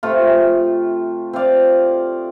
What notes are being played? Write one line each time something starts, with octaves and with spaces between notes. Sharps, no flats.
C3 A3 F4
C4 F4 D5 F5